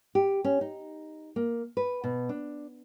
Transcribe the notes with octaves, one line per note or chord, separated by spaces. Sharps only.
G4
C#4
D#4
A#3
B4
B2
D4